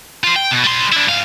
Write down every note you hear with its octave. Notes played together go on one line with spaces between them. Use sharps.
F4 C5
G5
B2
G3 C6
D4 E4
G#2 F5